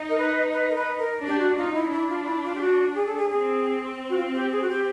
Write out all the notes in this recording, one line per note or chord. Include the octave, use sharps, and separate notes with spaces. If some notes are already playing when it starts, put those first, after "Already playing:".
Already playing: D#4
A#4
B4
B4
A#4
B4
A#4
D4 G4
F#4
D#4 F4
E4
D4 E4
F4
E4
F4
G4
F#4
G#4
A4
G#4
C4 G#4
F#4
F4
G4
G#4
F#4
G4